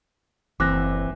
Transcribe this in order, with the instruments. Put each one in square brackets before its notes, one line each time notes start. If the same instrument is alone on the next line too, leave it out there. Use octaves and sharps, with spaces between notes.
[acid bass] F#1 [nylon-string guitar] E3 A3 C4 [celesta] D6 F#6 A#6